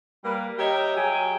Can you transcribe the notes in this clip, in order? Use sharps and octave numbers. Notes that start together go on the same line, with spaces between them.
G3 A#3 B4
G4 A#4 C#5 D#5 E5 G5
F#3 G#4 G5 G#5